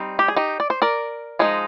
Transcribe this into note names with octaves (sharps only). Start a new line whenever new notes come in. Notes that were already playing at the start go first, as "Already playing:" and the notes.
Already playing: G3 C4 D#4
G4
G#4
D#4 G4
D5
C5
A#4 D5
F3 G#3 D#4